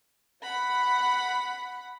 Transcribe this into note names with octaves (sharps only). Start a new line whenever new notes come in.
F#5 B5